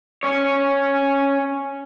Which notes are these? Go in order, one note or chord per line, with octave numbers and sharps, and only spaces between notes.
C#4 C#5